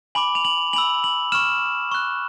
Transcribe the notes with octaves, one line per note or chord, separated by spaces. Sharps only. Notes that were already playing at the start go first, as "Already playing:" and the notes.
G#5 B5 D6 F#7
F7
F#7
G#5 B5 E6 F#7
F#7
C#6 F6 E7
C#6 F#6